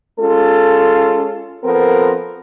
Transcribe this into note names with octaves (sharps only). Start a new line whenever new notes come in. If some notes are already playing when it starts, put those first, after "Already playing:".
G#3 C#4 F4 A4
F3 B3 C4 A4 A#4